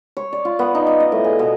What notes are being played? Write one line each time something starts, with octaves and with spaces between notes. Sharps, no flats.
C#5
D5
F4
B3
D#4
D6
D#5
A2
G#4
B2